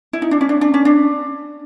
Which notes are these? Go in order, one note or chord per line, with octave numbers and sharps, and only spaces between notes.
E4
D#4
D4
C#4
D4
D4
C#4
D4